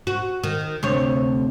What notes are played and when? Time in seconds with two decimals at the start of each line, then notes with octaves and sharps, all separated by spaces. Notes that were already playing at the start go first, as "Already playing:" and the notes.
0.07 F#4
0.44 D#3
0.83 D2 C3 C#5